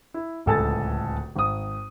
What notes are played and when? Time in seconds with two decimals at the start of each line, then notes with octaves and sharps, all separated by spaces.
0.14 E4
0.46 D1 C#2 A4 G#5 A5 A6
1.36 G#1 D#6